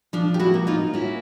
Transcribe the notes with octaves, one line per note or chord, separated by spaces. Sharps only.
F3 D4
G4
E4 F#4
A#3
D#4 F4
C#4 E4 F#4